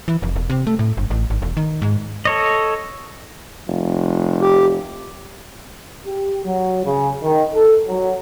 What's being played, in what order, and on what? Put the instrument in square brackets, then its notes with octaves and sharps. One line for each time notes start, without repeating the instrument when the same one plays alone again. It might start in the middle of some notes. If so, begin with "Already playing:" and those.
[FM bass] E3
F1
E1
C3
A3
A2
G1
A1
G#1
E1
D#3
G#2
[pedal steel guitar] A4 C#5 D#5
[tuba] F1
[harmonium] G4
[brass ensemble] G4
F#3
C#3
D#3
A4
F#3